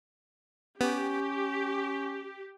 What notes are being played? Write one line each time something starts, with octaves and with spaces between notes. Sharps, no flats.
B3 C#4 G4